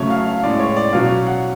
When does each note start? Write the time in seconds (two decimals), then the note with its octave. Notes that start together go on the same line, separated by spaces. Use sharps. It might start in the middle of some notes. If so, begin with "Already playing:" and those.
Already playing: C#3 F#3 A3 C#5
0.10 F5
0.27 F5
0.43 A2 G#3 C#4 D5
0.59 C#5
0.76 D5
0.93 B2 F#3 C#4 F5
1.27 F#5